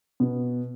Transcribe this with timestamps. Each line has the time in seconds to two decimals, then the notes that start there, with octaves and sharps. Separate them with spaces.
0.20 B2